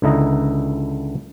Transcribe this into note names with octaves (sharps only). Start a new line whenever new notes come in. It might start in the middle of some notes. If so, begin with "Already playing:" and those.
C#2 D3 E4 D#5 A#5